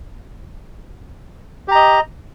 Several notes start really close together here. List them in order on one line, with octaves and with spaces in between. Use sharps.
G4 A#5 D#5